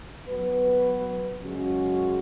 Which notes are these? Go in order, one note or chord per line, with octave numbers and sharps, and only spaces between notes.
F#3 B3 F#4 B4
F#2 C#3 G#3 C#4 F#4